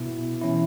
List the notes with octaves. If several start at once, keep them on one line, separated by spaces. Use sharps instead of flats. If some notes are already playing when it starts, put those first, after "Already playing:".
Already playing: B2 B3 E4
E3 C#4 E4